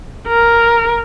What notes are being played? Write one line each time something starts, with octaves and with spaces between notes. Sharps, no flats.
A#4